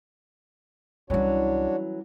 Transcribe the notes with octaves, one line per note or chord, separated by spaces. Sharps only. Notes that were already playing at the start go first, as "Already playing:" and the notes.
C2 E3 F#3 G3 C#4 D4 F#4 C#5